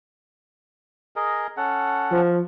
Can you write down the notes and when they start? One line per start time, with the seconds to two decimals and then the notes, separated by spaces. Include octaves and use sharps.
1.16 G#4 A#4 D#5
1.57 C#4 A4 F#5
2.11 F3